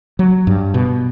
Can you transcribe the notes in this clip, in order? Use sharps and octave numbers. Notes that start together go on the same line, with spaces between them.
F#3
G2
B2